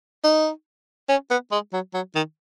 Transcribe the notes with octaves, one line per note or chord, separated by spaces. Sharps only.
D#4
C#4
B3
G#3
F#3
F#3
D#3